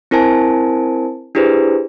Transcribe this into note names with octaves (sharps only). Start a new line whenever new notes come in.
C4 E4 A#4 C5 G#5 A5
D4 E4 G4 G#4 B4 C5